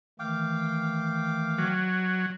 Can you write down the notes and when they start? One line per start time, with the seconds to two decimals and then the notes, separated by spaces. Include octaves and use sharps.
0.19 D#3 E3 A3 F5 G5 D6
1.58 F#3